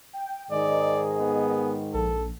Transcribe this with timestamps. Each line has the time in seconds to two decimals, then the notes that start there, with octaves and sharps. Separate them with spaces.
0.13 G5
0.52 G#2 D#3 G#4 D5 D#5
1.20 B3
1.94 A#1 A4